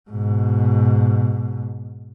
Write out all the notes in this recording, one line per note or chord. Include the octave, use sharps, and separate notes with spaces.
G#2 B2